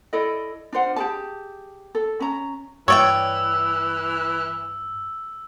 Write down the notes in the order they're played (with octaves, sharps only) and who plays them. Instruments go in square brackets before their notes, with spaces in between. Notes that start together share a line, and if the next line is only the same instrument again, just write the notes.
[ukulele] E4 A4 D5 D#5
D4 F4 C5 F#5
G4 G#4 A5
A4
C#4 A#5
[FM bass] G2 [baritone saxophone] E3 [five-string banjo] C#5 D5 G5 [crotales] E6